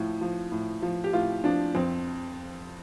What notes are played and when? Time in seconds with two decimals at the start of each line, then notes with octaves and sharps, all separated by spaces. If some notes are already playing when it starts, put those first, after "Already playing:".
Already playing: A2 F3
0.21 F3
0.52 A2
0.82 F3
1.04 G4
1.13 A2 F4
1.44 F3 D4
1.75 F2 C4